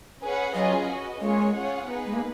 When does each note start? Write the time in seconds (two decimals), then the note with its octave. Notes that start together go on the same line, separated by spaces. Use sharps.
0.21 C#4 G#4 B4 F#5
0.54 F#3 C#4 F4 G#4 B4 D#5
0.87 F#4 B4 D#5
1.21 G#3 A#3 C#4 F4 G#4 C#5
1.54 C#4 F4 G#4 C#5 F#5
1.87 B3 D#4 G#4 B4
2.06 G#3
2.14 A#3